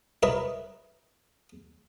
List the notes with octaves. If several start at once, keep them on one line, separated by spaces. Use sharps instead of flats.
E4 A#4 B4 C#5 D#5